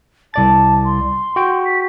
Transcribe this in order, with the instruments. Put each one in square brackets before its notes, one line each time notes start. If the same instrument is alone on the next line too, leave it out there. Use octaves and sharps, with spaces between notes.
[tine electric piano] C2 D5 A6 [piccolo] A5
[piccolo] C6
[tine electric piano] F#4 G5
[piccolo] B6